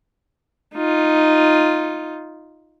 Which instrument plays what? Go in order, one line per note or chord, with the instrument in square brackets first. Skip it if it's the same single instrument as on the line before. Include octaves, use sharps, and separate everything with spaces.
[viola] D#4 F4